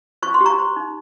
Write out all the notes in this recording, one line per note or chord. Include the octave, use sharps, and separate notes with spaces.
C5 C#6
C6
G4
A#5 C#6
C5
D#4